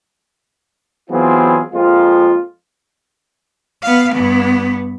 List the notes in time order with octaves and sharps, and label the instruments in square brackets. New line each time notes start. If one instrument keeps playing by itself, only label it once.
[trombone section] E3 F#3 B3 C4 F4 G#4
F2 G#3 A#3 F4
[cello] B3 F5
G2 B3